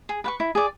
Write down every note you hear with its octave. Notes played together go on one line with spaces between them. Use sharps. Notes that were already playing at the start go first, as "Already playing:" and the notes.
G#4
B4 F#5 C#6
E4
G#4 D5